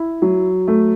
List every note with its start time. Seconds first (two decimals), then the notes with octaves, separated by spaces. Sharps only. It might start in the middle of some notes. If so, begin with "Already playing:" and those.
Already playing: E4
0.22 F#3
0.68 A3